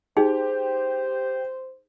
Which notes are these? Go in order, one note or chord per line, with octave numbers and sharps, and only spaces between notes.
D#4 G4 G#4 C5